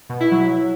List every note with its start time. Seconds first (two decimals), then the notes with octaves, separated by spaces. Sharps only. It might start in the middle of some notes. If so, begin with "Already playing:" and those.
0.09 B2
0.20 E4
0.31 F#3